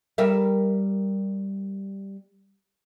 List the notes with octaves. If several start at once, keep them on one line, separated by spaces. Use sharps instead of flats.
G3 A#4 E5